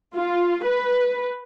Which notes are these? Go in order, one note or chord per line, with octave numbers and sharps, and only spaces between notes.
F4
B4